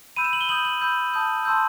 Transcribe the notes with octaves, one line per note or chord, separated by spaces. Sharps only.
B5 E6 G6 D#7
E7
F#7
G7
B5 D#6 G6 F#7
F#7
B5 E6 G6
A5 D#6 G6
A5 C6 E6 G6